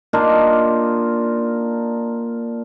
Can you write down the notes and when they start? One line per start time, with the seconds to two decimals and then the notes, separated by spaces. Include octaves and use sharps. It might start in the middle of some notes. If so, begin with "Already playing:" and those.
0.13 A#3 D4 D#4 F4